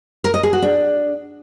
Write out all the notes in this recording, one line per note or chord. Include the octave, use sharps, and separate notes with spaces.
A#4
D#5
G#4
F#4
D4